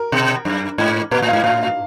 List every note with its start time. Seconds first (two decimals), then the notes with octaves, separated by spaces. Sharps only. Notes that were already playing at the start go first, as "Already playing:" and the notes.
Already playing: A#4
0.12 B2
0.45 F#2
0.78 G#2
1.11 A#2 B4
1.22 A2
1.28 F5
1.33 G#2
1.44 A2 F5
1.63 F5